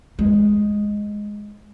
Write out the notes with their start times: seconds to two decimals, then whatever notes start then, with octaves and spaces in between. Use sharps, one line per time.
0.19 G#3